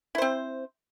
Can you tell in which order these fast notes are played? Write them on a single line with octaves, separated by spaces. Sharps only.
E4 C5 C4